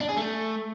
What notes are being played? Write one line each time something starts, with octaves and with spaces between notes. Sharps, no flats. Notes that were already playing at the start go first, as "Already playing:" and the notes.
D4
G#4
A3